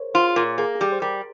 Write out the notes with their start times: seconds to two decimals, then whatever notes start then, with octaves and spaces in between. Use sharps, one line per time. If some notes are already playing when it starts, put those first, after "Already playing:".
Already playing: G#4 A#4 C5 C#5
0.14 F4 C5
0.36 A#2 A#4
0.58 A#3 G#4
0.75 G#4
0.80 G3 G4
0.92 C5
1.02 G3 A#4